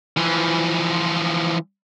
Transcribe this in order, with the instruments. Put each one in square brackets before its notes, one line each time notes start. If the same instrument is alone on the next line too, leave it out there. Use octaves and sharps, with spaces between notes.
[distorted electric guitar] E3 F3